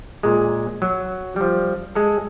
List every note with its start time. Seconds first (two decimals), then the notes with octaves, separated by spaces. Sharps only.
0.23 A#2 G#3
0.82 F#3
1.36 F3 G3
1.95 G#3 A4